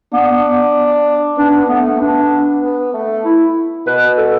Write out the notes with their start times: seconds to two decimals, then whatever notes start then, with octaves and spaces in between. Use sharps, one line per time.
0.13 B3 D4
1.37 B3 D4
1.69 A3 B3
2.00 B3 D4
2.62 B3
2.94 A3
3.25 E4
3.87 B2 B4
4.17 A4